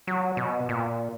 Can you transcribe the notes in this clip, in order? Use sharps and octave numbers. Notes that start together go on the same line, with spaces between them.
F#3
B2
A#2